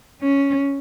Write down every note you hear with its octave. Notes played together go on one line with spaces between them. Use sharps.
C#4